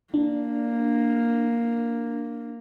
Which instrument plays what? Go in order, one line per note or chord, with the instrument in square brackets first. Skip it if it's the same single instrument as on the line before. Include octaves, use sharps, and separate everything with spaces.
[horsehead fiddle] A#3 [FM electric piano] D4